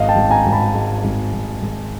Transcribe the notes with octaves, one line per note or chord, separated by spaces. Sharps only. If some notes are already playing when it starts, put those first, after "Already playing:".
Already playing: G#1 D#5 F5
G5 A5
G#1
G#5 A#5
G#1
A5 B5
G#3
G#1
G#1
G#1